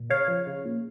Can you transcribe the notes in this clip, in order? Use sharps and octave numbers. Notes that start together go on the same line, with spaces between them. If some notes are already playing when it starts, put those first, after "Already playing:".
Already playing: A#2
C#3 C#5 F5
F3
C#3
A#2